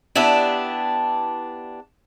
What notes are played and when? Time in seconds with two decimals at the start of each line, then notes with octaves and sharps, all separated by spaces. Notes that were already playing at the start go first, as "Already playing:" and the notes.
0.15 B3 D4 E4 G4